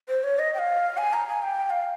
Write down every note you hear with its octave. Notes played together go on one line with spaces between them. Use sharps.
C5
C#5
D#5
G5
F5
G#5
A#5
G#5
G5
G5
F5